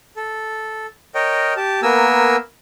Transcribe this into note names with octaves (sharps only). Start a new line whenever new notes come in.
A4
A#4 C#5 D#5 G5
G4 A5
A#3 B3 A#4 G#5 E6